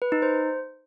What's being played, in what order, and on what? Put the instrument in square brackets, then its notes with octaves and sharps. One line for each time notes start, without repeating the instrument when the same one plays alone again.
[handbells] B4
D#4
C5